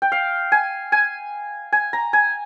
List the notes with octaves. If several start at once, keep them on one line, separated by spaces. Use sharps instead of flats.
G5
F5
G#5
G#5
G#5
A#5
G#5